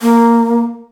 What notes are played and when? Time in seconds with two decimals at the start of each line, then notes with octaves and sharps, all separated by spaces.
0.02 A#3